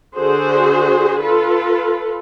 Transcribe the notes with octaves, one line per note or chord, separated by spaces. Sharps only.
D3 F#4 G#4 C5
F4 A4 B4